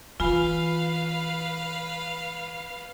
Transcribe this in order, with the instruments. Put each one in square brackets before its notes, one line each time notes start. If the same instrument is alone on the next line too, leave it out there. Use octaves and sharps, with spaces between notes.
[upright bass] E3 [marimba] F4 G#5 B5 [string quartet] B4 F5